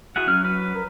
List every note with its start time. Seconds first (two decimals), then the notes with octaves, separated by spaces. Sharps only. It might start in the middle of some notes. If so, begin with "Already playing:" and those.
0.16 E4 F#4 G#4 F#5
0.27 F#3 C#4 F6
0.44 B4
0.75 A#4